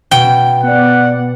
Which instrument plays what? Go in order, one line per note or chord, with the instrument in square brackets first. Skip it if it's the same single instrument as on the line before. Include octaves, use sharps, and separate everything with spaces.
[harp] B2 [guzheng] G5
[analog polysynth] B3 D5 [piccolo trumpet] F#5